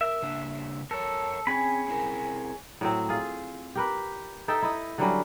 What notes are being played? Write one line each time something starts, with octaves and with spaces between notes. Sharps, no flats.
A#4 E5
C#3 A#3 D4
A4 A#4 C#5
C4 C#4 G#4 B5
C4 E4 A#4
A2 F#3 C4
F4 G#4
G4 A#4 B4
D#4 A4 E5 G5
E4 D#5
D3 F#3 G3 C#4